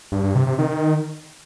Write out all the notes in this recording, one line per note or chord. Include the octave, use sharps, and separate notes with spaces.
G2
G2
C3
C3
D#3